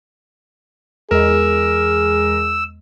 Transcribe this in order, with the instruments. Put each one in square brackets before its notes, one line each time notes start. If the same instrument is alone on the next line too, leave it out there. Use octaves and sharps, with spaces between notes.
[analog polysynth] E2 G#3 [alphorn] G#4 [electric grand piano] A#4 [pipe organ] E6